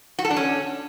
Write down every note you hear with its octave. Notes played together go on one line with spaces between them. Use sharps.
F#4
A4
D4
C#4